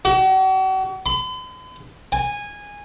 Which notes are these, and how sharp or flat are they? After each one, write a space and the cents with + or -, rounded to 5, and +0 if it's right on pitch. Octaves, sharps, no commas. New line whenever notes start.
F#4 +40
B5 +45
G#5 -15